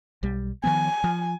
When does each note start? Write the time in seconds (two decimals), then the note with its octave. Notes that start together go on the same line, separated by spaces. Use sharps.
0.23 B1 G3
0.64 D#3 F3 B3 G#5
1.04 F3